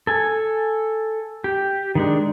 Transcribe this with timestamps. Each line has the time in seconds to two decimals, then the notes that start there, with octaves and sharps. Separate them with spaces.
0.07 A4 G#5
1.44 G4
1.95 D#3 G#3 D4